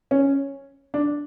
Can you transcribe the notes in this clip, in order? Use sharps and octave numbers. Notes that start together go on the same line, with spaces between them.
C#4
D4